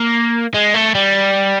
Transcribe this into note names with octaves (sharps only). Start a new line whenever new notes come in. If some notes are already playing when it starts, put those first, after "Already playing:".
Already playing: A#3
G#3
A3
G3